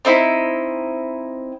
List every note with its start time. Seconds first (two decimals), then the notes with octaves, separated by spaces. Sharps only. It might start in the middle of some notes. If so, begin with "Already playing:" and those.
0.05 C4 D#4 E4